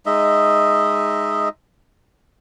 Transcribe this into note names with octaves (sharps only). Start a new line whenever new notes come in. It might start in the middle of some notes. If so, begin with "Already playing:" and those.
G#3 D#4 D#5 E5